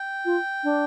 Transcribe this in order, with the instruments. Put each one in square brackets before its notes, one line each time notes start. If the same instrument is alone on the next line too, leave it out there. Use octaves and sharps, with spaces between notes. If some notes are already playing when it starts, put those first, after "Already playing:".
Already playing: [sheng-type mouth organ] G5
[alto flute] F4
D4